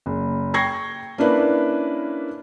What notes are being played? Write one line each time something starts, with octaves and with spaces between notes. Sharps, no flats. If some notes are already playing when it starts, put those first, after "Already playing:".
F#1
G5 C#6 G#6 A#6 C7
A#3 C#4 D4 E4 B4 D5